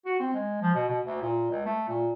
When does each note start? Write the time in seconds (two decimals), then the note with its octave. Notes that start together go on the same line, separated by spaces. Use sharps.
0.06 F#4
0.20 C4
0.34 G#3
0.62 F3
0.75 B2
0.89 B2
1.06 D2
1.22 A#2
1.51 C#2
1.66 A3
1.89 A#2